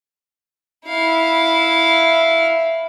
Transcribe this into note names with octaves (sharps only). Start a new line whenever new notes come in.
E4 F5